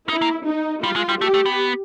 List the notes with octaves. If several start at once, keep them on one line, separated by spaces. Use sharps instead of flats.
D#4 E4
A#3
D#4
G3 F4
G#3
G3
A3 G4
A3
B3